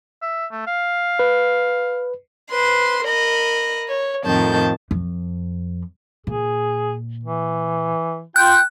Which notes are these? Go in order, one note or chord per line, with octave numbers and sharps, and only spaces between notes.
E5
A3
F5
B4
B4 C5 C6
A#4 D#5 B5
C#5
F2 A2 D#3 A5 G6
F2
A#2 G#4
E3
F4 G5 F#6